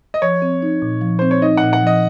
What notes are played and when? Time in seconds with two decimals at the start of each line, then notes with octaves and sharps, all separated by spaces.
0.14 D#5
0.22 F3 C#5
0.42 C4
0.62 D#4
0.82 A#2
1.02 F3
1.19 C4 C5
1.31 C#5
1.42 D#4 D#5
1.57 A#2 F#5
1.73 F#5
1.83 F3 D#5